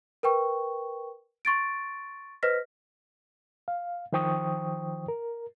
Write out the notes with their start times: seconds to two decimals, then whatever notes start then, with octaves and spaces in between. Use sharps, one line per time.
0.23 A#4 B4 G5 C#6
1.45 C6 C#6 A6 D7
2.43 B4 C5 D#5 F6 A#6 B6
3.68 F5
4.13 D#3 F3 C5 G5 C#6 D#6
5.08 A#4